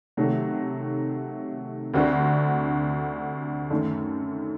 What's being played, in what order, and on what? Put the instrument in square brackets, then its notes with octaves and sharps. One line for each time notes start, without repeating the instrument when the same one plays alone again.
[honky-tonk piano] C3 D#3 F#3 A3
D2 D3 G3 C4 F#4
F#2 D#3 A3